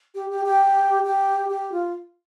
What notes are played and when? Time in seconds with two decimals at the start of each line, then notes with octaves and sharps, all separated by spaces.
0.15 G4
0.30 G4
0.45 G4
1.05 G4
1.50 G4
1.72 F4